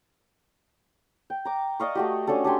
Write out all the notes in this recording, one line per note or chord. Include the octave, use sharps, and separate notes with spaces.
G5
A#5 D6
D5 D#5 F5 C#6
A3 F#4 G4
C#4 D4 F#4 A4
D4 G4 G#5 C6